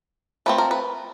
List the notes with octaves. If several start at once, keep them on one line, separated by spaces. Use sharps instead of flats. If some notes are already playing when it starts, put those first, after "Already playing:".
F3 A3 C4 B4
A#4
B4